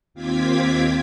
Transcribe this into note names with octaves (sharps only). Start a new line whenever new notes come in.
D#2 C4 F4 D6 G#6 B6